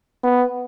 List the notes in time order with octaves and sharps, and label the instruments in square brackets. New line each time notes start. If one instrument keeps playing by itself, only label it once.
[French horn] B3